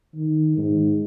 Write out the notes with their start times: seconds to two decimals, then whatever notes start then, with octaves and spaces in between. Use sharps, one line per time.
0.15 D#3
0.57 G#2